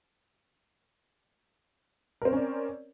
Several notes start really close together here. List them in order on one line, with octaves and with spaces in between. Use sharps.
A#4 C4 C#5 C#4 D5